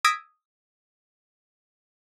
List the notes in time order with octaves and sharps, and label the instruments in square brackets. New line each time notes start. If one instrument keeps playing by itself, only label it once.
[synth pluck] D#6 E6 G#6 A#6 B6 D7